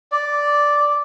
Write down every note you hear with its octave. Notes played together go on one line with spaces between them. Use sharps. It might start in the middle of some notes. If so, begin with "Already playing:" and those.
D5